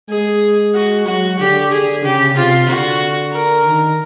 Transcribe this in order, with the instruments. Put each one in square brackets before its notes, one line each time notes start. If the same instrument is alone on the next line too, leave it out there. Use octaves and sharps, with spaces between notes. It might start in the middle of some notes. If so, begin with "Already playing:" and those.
[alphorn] G#3 [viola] G#4
[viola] F#4
[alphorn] F#3 [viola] F#4
[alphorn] D3 [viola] G4
[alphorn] D3 [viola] G#4
[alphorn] C#3 [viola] G4
[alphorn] C3 [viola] F4
[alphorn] D3 [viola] F#4
[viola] A#4
[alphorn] D#3